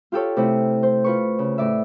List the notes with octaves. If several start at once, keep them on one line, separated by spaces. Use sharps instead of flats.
F4 G4 A4 C#5
C3 A3 E4
C5
F4 B4 C#6
C#3
A2 D5 E5